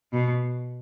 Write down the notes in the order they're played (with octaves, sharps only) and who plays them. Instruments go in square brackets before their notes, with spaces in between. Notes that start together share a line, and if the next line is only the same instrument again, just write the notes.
[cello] B2